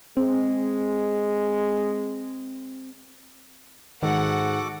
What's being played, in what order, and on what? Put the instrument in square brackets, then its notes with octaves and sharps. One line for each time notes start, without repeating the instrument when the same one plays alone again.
[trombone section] G#3 [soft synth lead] C4
[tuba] G#2 [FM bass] D#3 [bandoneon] F#4 A4 D6 [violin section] F#5